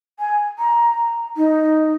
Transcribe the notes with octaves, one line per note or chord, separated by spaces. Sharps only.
G#5
A#5
D#4